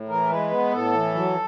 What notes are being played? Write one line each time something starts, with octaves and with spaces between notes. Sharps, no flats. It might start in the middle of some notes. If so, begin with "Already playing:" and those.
Already playing: A2
E3 A#4
G#3 B4
B3
A2 A4
E3
F#3